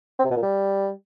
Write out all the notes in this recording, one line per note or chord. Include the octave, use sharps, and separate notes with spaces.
C4
C3
B2
A#2
G3